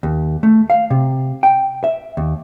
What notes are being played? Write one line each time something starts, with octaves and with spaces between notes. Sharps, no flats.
D#2
A3
F5
C3
G5
E5
D#2